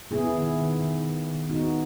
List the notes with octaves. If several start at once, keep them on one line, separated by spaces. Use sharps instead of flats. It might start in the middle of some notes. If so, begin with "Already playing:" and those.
B3 E4 G#4
D#3
D#3
D#3
D#3
D#3
B3 D#4 F#4